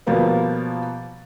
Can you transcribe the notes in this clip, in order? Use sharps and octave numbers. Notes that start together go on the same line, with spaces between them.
B2 F3 G3 A#3 B3